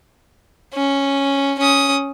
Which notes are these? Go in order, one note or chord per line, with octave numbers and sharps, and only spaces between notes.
C#4
C#4 D#6